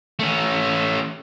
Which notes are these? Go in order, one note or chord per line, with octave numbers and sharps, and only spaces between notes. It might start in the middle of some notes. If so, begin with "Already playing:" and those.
A3 C#4